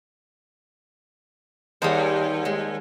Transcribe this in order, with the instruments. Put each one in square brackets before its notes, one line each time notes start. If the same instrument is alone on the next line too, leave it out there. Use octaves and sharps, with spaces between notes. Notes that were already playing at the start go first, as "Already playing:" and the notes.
[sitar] D#2 [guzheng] G3 G#4 C5
[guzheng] G#3